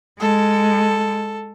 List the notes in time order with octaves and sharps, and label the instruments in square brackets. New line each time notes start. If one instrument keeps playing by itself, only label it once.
[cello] G#3 [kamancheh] A4